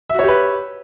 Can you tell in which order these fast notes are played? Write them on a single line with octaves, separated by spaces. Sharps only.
E5 F#4 C#5 G4 B4